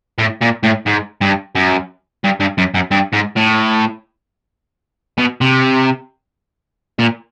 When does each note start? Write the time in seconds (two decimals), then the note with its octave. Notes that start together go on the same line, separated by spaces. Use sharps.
0.19 A2
0.42 A#2
0.64 A2
0.87 G#2
1.21 G2
1.55 F#2
2.24 G2
2.40 G2
2.58 F#2
2.75 F#2
2.91 G2
3.13 G#2
3.37 A2
5.18 B2
5.41 C3
6.99 A#2